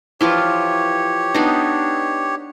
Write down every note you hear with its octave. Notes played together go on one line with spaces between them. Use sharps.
E3 F3 F4 G4 C#5
B3 D4 D#4